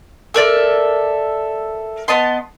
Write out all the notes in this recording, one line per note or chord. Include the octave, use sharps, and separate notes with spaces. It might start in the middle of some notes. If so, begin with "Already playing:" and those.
A4 A#4 D5 E5
B3 D#5 A5 C6